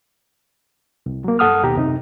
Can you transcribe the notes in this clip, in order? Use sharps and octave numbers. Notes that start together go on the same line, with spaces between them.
C2
F#3 A#3
G2 A4 F#5 D#6 F6
D#2 B2 D#3 G4 A#5
F#2 C3 D#4